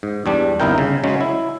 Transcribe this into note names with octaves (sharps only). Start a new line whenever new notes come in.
G#2
E2 G3 D4
G1 C2 D#4 E4 A#4 G5
C#3
C#3 F#3 G#3 C#4
E4